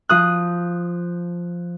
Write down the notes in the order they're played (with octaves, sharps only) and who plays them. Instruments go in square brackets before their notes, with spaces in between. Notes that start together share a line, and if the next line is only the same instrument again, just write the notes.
[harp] F3 D#6 F#6